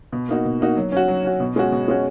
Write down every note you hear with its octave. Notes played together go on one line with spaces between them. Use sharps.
B2
A#3 D#4 F#4
B2
A#3 D#4 F#4
F#3
C#4 F#4
F#3
C#4 F#4
B2
G#3 C#4 F#4
B2
G#3 C#4 F#4